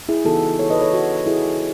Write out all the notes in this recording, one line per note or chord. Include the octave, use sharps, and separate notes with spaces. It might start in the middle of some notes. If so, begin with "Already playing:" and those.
E4 G#4
C#3 E3 B3 D#4 F#4 A4
A4 C#5
B4 D#5
A4 C#5
F#4
E4 G#4